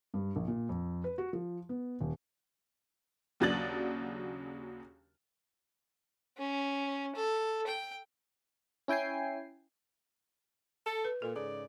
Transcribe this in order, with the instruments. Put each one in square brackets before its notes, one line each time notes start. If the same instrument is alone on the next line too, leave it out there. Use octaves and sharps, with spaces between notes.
[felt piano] G2
A#1
A#2
F2
B4
F#4
F3
B3
D#1
[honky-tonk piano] D#2 C#3 F#3 D4 A6 F#7
[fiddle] C#4
A4
G5
[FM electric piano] C#4 E4 G5 G#5 C7
[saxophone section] A4
[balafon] B4
[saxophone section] A#2 [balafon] A4
[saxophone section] G#2 C#3 D5